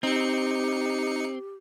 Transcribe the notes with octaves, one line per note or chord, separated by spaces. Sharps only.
C4 D#4 G4 C#7